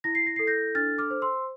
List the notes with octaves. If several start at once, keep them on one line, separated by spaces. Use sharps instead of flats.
E4 A#6
C7
A#6
A4 C7
G6 A#6
D4 F6 A6
D6 F6
C5
C6 E6